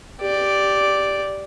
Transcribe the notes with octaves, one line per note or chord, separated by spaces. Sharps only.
G4 D5